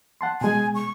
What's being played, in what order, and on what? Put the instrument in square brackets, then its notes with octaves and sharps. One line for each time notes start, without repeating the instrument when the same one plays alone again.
[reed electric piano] F#5 A5 C6
[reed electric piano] B2 G#3 [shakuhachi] G#5
[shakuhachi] C#6